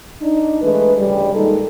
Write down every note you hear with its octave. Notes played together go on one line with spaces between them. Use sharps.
D4 D#4
E3 G#3 A3 B4
D2 C#3 E3 G3
A#2 D#3 G#3 D#4 A4